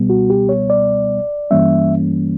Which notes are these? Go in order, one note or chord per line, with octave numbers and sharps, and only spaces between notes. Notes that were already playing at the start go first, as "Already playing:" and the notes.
Already playing: C#2 B2 G3 B3
F#4
G4
C#5
D5
G2 E3 G3 A#3 C#4 E5